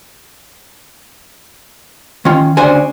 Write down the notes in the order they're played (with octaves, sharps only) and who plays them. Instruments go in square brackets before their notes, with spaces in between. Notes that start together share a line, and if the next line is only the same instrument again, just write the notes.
[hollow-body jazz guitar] D#3 C#4 F4
D2 C#3 D4 F#4 C5 G#5